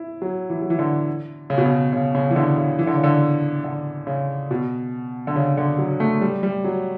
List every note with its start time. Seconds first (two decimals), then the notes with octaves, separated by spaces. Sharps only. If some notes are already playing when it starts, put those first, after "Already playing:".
Already playing: E4
0.22 F#3
0.50 E3
0.62 F#3
0.70 E3
0.79 D3
1.50 C#3
1.58 B2
1.66 C#3
1.93 C#3
2.15 C#3
2.31 E3
2.36 D3
2.58 C#3
2.79 E3
2.87 D3
2.96 C#3
3.03 D3
3.64 D3
4.07 C#3
4.51 B2
5.27 D3
5.36 C#3
5.57 D3
5.78 F#3
6.00 A3
6.21 G3
6.43 G3
6.64 F#3